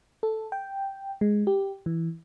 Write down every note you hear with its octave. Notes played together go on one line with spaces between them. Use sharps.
A4
G5
G#3
G4
E3